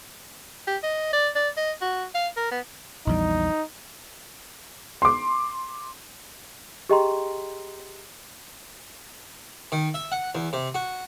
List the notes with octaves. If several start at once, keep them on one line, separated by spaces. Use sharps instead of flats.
G4
D#5
D5
D5
D#5
F#4
F5
A#4
B3
A#1 E2 G3 D#4
C6 D6
G4 G#4 D#5 G5 A#5 C6
D#3
E5
F#5
E2
C3
F#4